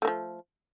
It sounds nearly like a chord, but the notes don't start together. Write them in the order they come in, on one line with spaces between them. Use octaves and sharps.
A3 A#3 F3